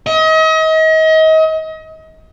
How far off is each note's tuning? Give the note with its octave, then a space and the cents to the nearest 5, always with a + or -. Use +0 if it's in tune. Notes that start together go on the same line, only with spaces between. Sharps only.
D#5 +35